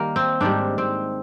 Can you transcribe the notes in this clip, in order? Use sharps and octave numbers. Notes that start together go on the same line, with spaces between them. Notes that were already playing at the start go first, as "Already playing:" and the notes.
Already playing: D#3 G3 A#3
C4
G#2 D#3 G3 D4
C4